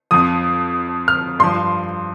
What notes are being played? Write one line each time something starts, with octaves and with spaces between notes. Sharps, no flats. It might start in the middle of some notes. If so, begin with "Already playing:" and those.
F2 F3 D#6
F6
G2 F3 C6